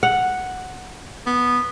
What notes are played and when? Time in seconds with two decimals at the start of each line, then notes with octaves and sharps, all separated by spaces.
0.03 F#5
1.27 B3